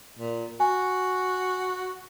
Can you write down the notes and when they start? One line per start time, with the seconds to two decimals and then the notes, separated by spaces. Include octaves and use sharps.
0.19 A#2
0.60 F#4 G#5